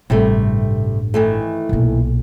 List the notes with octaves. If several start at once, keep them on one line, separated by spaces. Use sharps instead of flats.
A1 G2 C3 G3 A3
D#3 E3 A3
B1 A#2